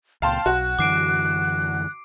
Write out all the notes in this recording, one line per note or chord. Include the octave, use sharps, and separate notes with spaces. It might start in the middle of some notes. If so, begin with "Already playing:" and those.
C#2 A#2 F5 G5 A5 C6
B1 F#4 F#6
F#2 D3 E3 D6 C7 D7